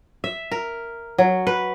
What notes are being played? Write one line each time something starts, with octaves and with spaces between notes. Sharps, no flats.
E5
A#4
F#3
B4